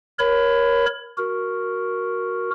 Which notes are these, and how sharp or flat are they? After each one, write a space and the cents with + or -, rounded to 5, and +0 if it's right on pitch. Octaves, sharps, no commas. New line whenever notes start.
A#4 +20 C#5 +0 B5 +20
F#4 +0 A#4 +0